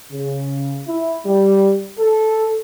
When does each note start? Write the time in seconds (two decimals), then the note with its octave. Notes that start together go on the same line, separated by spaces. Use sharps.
0.12 C#3
0.87 E4
1.26 G3
1.99 A4